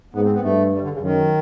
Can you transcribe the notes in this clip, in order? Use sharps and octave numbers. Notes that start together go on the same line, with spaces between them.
G#2 B3
C4
B3
G2 A3
G3
D3
C#3
F#2 D#3